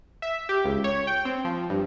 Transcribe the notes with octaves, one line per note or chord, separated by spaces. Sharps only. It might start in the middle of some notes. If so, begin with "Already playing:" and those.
E5
G4
C#2
C#5
G5
C4
F3
G2